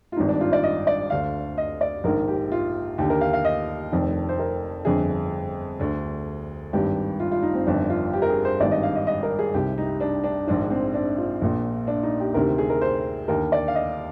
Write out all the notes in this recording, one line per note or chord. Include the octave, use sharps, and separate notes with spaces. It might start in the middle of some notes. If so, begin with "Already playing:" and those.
F4
G#1 G2 D#3 D#4
D4
F4
D5
D#5
D5
D2 D3 F5
D#5
D5
A#1 G#2 D#3 A#4
G4
F4
D#2 D3 G4
A#4
F5
F5
D#5
F1 F2 D#3
C5
A#4
G1 F2 D3 G#4
D2 D3
G#1 G2 D#3 G4
F4
F4
D#4
C4
G1 F2 D#3 D4
F4
G4
A#4
G#4
C5
G#1 G2 D#3 D5
D#5
F5
D#5
D#5
A#4
G#4
C2 C3 D#3 G4
D#4
D4
D4
A#1 G#2 D#3 D4
C4
D4
F4
A#1 A#2
D4
D#4
G4
D2 C3 D#3 A#4
G#4
A#4
C5
D#2 D3 A#4
D5
F5
D#5